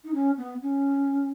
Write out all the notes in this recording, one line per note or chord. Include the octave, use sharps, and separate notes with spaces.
D#4
C#4
B3
C#4